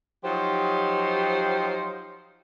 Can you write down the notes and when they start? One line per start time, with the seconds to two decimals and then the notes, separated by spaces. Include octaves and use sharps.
0.24 F3 F#3 D#4 G4 C5